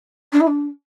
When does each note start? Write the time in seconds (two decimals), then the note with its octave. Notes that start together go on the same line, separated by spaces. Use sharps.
0.33 D4
0.40 E4
0.47 D4